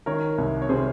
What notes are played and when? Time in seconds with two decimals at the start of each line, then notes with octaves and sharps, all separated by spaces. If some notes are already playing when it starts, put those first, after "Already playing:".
0.06 D#3 A#4 C#5
0.38 C2
0.62 C#5
0.69 C3 G#4 C5